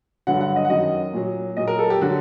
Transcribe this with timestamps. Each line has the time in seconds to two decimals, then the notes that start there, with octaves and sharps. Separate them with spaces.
0.27 G2 D3 F#3 F#5
0.41 F#5
0.56 D#5
0.65 F#5
0.69 F#2 D#3 F#3 D#5
1.14 A#2 F#3
1.57 A#2 F#3 D#5
1.68 A#4
1.79 A4
1.90 G4
2.01 D3 F#3 F#4